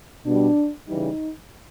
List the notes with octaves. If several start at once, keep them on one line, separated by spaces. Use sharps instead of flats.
B2 G3 D4
C#3 E3 G3 D#4